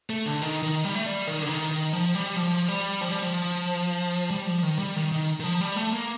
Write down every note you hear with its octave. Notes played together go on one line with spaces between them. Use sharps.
A3
D3
D#3
D#3
G3
A3
G3
D#3
D3
D#3
D#3
F3
G3
F3
G3
F3
G3
F3
G3
F3
D#3
G3
D#3
D#3
D#3
F3
G3
A3
A#3